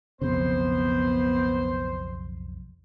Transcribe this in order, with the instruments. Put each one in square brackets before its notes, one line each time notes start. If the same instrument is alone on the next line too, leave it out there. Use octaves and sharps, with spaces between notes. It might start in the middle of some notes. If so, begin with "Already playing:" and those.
[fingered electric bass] B1 F2 C#3 [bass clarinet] B3 [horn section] C5